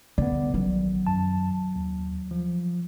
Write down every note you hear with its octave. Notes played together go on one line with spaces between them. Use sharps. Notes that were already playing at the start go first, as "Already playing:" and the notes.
D3 B3 D5
A#1 D#3 F#3
F#2 A5
D#2
F3